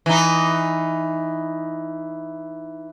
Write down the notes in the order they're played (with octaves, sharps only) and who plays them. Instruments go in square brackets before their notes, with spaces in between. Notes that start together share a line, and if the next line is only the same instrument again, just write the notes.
[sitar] E3 D#4